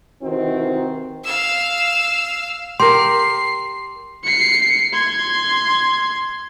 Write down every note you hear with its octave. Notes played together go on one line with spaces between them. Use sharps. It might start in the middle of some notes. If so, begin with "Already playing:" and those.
C3 D#3 E3 C4 D#4 F#4
F5 E6
G4 A#4 C6 C7
C7 C#7
C6 G#6